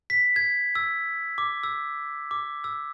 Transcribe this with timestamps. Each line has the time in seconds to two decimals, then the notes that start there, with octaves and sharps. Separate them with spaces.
0.10 B6
0.36 G#6
0.75 E6
1.38 D6
1.64 E6
2.31 D6
2.64 E6